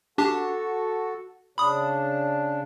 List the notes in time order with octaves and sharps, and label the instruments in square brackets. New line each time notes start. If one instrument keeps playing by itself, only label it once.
[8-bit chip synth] D4 G4 A5 [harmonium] F#4 A4
[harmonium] C#3 D4 [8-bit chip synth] B5 D#6